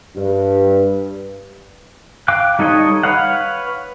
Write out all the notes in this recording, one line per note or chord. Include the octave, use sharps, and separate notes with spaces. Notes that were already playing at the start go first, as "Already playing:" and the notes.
G2
F5 G5 D6 F#6
G3 D#4 A4 C#5 D#5
B4 C#5 F5 F#5